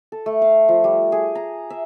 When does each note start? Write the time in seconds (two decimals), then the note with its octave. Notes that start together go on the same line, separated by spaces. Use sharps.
0.12 A4
0.26 A3
0.42 F5
0.68 F3
0.84 G3
1.12 G#4
1.35 A#5
1.70 E5